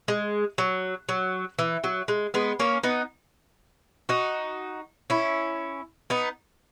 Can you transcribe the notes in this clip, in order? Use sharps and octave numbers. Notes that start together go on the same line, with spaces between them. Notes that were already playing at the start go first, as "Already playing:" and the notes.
G#3
F#3
F#3
E3
F#3
G#3
G#3 B3
A#3 C#4
B3 D#4
D#4 F#4
C#4 E4
B3 D#4